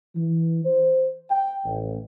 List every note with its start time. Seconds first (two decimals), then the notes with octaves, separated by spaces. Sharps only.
0.15 E3
0.65 C5
1.30 G5
1.65 A1